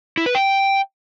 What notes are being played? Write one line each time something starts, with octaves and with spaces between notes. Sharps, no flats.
E4
B4
G5